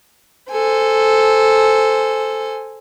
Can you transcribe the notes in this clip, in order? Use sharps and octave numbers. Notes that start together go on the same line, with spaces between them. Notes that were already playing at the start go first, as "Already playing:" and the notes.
A4 C5 G#5